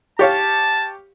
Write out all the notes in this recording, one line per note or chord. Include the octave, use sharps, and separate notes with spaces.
G4 C#5 F5 A5